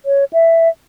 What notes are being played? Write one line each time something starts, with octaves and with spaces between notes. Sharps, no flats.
C#5
E5